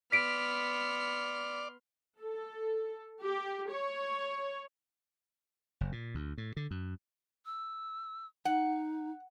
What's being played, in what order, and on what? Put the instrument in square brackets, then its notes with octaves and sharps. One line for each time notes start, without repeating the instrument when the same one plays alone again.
[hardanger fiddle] B3 [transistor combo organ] D5 [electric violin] C6 F6 [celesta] B6 D7
[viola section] A4
G4
C#5
[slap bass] F#1
A#2
D2
A2
D3
F#2
[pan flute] E6
[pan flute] D#4 [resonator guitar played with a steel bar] F#5